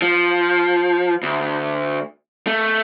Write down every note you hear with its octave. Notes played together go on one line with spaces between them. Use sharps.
F3
D2
A3